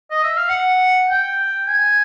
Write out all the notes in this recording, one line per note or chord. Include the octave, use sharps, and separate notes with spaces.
D#5
E5
F5
F#5
G5
G#5